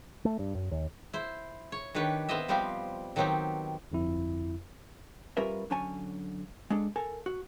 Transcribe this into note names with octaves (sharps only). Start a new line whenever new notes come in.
A3
G2
F#2
D#2
E4 C5
C#5
D#3 D4 G4 B4 C#5
B3 C4 C5 D#5 E5
F3 G3 B3 C4 G4 F5
D#3 F#3 B3 C4 D#4 G4
G1 F2 E4
G3 C#4 F4 A#4 B4 E5
D3 F#3 C#4 C#5 G#5 A5
G#3 D4 A4
A4 A#4 G#5
F#4